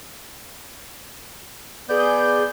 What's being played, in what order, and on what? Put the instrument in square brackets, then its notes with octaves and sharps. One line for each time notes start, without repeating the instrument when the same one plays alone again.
[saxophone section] B3 D5 [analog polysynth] G#4 G6